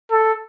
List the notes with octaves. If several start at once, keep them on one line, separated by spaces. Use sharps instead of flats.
A4